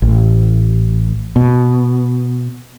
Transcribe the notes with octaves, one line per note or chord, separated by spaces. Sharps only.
A1
B2